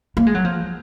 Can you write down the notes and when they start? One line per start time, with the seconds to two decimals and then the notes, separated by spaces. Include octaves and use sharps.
0.17 A#3
0.27 G#3
0.35 F#3
0.45 F3